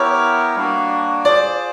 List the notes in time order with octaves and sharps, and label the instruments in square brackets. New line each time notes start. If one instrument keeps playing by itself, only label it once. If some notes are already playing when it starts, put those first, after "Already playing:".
Already playing: [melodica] B3 E4 G4 A#4 [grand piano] C#5
[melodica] G3 A#3 D4 F#4
[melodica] F4 G#4 C5 [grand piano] D5